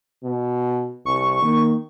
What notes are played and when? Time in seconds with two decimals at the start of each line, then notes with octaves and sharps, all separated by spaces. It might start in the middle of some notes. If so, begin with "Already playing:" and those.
0.23 B2
1.06 C2 C#6
1.42 D#3 A#3